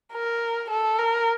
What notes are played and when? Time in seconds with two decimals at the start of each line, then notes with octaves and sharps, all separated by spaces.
0.13 A#4
0.70 A4
0.99 A#4